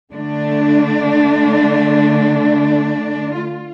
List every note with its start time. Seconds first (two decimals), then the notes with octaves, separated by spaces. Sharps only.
0.12 D3 A3 D4
3.43 F4